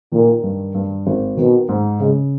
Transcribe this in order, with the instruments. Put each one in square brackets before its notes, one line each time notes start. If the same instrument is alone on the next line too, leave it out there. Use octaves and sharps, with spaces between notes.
[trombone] A#2 [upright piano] D#3
[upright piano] G2
G2
G#1
[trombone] B2 [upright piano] D#3
[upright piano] G#2
[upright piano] C#3 [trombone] G#3